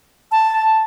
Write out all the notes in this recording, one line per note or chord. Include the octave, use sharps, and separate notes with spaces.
A5